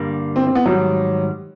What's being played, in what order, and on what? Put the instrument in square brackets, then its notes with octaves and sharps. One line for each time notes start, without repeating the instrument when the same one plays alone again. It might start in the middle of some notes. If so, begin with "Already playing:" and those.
Already playing: [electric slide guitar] G2 D3 G3 A#3
[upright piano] C4
C4
B3
[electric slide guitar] G#2 D#3 G3 [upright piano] F#3